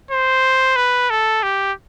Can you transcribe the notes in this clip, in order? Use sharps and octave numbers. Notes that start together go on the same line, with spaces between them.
C5
B4
A4
G4